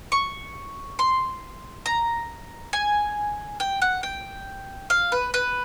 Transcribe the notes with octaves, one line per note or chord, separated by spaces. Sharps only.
C#6
C6
A#5
G#5
G5
F#5
G5
F5
B4
B4